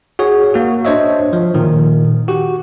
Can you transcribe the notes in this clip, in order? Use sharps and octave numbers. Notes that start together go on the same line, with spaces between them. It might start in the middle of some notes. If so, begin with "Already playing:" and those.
F#4 G#4 C#5
A#3 F#4
D4 C5 C#5 D#5 E5
F3
A#2 D#3
F#4 G4